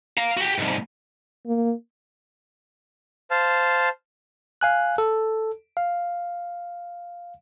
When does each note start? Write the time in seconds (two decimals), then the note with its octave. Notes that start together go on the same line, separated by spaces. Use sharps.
0.18 F5 A#5
0.37 F#4 G4
0.58 C2 G#2
1.46 A#3
3.31 C5 F5 A5
4.61 F5 G#5 F#6
4.98 A4
5.77 F5